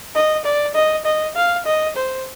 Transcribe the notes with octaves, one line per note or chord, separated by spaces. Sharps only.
D#5
D5
D#5
D#5
F5
D#5
C5